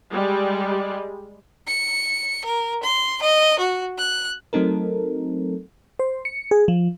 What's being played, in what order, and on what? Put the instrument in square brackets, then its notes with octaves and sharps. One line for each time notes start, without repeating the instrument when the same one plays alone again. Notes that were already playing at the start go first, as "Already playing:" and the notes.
[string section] G3 G#3
[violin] C#7
A#4
C6
D#5
F#4
F#6
[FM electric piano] F#3 A3 C4 D#4 A4 A#4
C5
C#7
G#4
F3